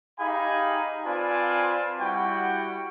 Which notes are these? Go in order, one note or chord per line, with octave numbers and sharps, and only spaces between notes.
D#4 G4 G#4 F5 G#5 B5
C4 F4 B4 D5 G#5 A5
G3 E4 F#4 F#5 G5